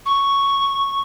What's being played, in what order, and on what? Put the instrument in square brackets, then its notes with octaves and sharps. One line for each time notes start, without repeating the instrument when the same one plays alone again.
[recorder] C#6